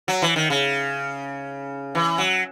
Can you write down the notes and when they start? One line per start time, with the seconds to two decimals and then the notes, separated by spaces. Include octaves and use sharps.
0.08 F#3
0.22 E3
0.36 D#3
0.50 C#3
1.95 E3
2.18 F#3